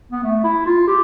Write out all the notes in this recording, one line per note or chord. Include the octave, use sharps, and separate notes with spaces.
B3
A3
E4
F4
G4